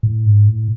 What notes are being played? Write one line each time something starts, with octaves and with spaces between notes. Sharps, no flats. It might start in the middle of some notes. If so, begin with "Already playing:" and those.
A2
G#2
A2